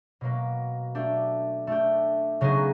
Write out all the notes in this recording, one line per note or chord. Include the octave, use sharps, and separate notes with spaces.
B2 F#3 A#3
A3 D4 G4
A3 D4 G4
C#3 F#3 B3 D#4 G#4